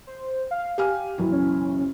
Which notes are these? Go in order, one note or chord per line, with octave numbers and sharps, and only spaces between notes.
C5
F5
G4 F5 G#5 F6
F#1 B1 E3
C#4